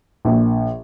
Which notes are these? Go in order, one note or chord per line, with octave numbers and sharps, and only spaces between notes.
A#1